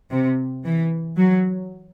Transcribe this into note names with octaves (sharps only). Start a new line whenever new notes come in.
C3
E3
F#3